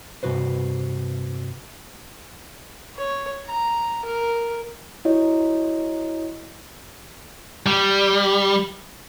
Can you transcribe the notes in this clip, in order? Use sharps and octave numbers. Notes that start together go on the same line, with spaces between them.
G2 C3 F#4 B4 C5
C#5
A#5
A#4
E4 F#4 C#5 D#5
G3